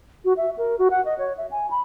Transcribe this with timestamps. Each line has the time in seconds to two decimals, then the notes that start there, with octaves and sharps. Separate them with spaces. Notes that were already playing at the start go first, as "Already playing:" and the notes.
0.25 F#4
0.37 E5
0.58 A#4
0.79 F#4
0.91 F#5
1.05 D#5
1.18 C#5
1.37 E5
1.51 G#5
1.70 B5